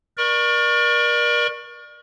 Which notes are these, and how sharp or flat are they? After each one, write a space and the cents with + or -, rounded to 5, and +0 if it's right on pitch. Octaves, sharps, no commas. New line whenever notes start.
A#4 +35 D5 +25 C#6 -10